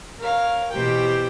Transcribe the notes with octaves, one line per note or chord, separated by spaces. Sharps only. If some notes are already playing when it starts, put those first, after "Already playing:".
A#4 C#5 F5
B2 E3 G4 C5 G5